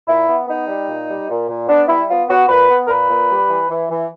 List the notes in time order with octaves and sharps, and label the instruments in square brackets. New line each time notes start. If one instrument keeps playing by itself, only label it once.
[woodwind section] A#2 E4
B3
B3 D#4
G3
A#2
G3
A#2
A#2
B3 D4
G3 E4
B3 F4
B3 F#4
A#2 B4
B3
A#4
A#2 B4
A#2
G3
E3
E3
E3